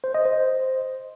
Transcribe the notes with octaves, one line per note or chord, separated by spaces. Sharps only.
C5
D#5
C5